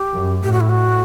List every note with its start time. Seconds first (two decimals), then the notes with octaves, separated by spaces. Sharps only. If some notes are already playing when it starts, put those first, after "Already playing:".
Already playing: G4
0.14 F#2
0.44 A2 G4
0.52 F#4
0.61 E4
0.69 F#4